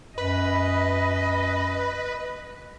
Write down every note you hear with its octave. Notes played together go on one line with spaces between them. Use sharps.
F#2 B4 D#5